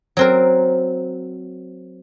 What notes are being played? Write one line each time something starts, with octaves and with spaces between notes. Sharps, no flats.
F#3 C4 A#4